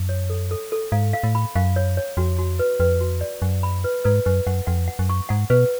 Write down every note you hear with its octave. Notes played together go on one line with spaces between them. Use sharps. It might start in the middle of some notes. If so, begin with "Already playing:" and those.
Already playing: F#2
C#5
A4
A4
A4
G#2 F5
F5
A2
B5
F#2 F5
C#5
C#5
F2 F#4
F#4
B4
F2 B4
F#4
D5
F#2 F#5
B5
B4
G#2 B4
F#2 B4
F#2 F#5
F2 F#5
F#5
F#2
C#6
G#2 F#5
B2 B4